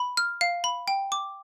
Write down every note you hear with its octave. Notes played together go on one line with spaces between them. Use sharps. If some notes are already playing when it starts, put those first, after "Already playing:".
Already playing: B5
F6
F5
B5
G5
D6